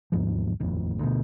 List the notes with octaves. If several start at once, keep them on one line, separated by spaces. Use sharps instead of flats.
E1 D#2 G#2 F3
D#1 A1 F2
D2 B2